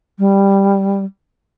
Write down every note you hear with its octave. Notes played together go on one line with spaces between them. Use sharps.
G3